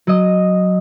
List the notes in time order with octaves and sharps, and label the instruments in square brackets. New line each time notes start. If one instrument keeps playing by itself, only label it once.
[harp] F#3 D#5